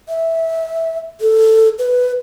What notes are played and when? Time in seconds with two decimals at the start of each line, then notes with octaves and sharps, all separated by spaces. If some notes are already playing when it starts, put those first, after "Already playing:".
0.09 E5
1.21 A4
1.78 B4